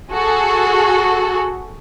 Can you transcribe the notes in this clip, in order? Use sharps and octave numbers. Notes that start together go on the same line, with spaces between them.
F#4 G#4 A4